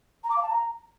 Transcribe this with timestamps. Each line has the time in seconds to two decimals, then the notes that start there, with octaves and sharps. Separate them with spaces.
0.23 A#5
0.30 D6
0.36 F5
0.42 A5
0.49 A#5